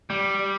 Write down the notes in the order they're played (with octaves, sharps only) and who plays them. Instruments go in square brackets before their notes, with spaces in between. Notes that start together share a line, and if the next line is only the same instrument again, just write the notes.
[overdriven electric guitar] G3